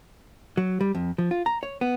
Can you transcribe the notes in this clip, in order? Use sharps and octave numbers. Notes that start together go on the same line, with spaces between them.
F#3
G3
F2
F3
F4
A#5
C#5
B3